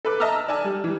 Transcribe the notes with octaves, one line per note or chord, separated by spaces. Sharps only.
A4 B4 D6
D#5 E5 A5 A#5 E6 F6
E6
D5 G#5 A5
G3
E3 G3